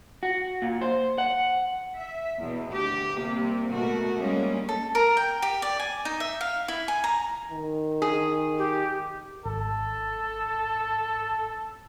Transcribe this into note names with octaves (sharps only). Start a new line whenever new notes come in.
F#4
A#2
C5
F#5
E5
E2 B2
D2 G4
C3 G3 A#3
B2 A3 F#4 A#4
G3 G#3 A#3 C#4
A4
A#4
G5
G4
D5
G#5
D#4
E5
F5
E4
G#5
A#5
D#3
G#4
G4
G#1 A4